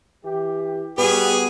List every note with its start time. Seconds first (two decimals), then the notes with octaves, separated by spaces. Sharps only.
0.25 E3 G4
0.98 G3 B3 F#4 G#4